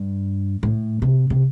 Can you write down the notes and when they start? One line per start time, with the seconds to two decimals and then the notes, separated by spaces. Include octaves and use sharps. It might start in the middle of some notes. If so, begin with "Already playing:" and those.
Already playing: G2
0.63 A2
1.02 C3
1.30 C3